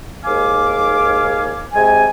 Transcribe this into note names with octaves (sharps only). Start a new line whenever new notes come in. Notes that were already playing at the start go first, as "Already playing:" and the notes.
D#2 G#2 F5 G#5 D6
C3 G#3 G#5